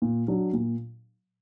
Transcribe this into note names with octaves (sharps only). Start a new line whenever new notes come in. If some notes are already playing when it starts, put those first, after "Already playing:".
A#2
F#3 D4
A#2